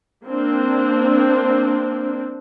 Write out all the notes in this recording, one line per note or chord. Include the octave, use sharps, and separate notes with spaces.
A#3 C4 D4